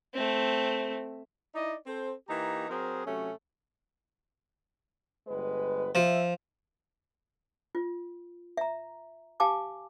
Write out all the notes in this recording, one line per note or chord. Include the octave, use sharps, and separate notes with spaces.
A3 C4
D#4 E4 D5 D#5
C4 A4 C5
E3 A#3 D#4 G4 A#5
F#3 C4 G#4 A#4 C5
C3 F#3 A3 C#4
G1 G#3 B4
F3 E5
F4
E5 A#5
G4 F5 G#5 A5 D6